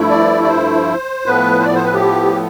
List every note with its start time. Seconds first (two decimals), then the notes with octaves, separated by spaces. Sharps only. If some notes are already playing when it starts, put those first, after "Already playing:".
Already playing: G2 F3 A3 E4
0.09 D5
0.44 D5
0.48 C5
1.26 A2 F3 B3 B4
1.59 C5
1.64 D5
1.75 C5
1.84 B4
1.94 G4